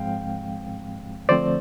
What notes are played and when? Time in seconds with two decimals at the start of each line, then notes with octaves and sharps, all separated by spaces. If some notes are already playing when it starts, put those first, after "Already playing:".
Already playing: G#2 F3 G#3 C4 F5 G5
1.29 D3 F3 A3 C4 C5 D5